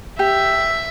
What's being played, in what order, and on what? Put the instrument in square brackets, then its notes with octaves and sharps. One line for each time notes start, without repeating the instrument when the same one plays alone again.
[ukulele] G4 [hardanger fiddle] E5